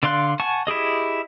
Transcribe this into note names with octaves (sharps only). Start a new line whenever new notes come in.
D3 D5 F5 C6 F#6
F#5 G#5 A5 C#6
E4 G4 G#4 D#5